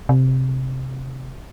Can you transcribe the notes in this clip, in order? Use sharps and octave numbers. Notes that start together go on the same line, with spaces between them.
C3